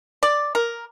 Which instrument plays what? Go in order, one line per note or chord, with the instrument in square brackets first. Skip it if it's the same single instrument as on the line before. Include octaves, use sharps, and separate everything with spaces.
[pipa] D5
A#4